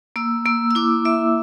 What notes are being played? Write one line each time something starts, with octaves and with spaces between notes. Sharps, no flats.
A#3 E6
A#3 E6
E6
E4 D6
A#3 E5